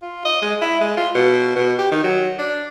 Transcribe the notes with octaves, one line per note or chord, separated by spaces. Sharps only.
F4
D#5
G#3
E4
G#3
F4
B2
B2
G4
D#3
F#3
D4